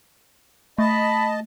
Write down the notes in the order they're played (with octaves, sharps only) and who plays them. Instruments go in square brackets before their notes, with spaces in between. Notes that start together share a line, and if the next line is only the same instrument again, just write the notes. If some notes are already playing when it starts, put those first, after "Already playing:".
[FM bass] A3 [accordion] D#5 A5 [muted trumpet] B5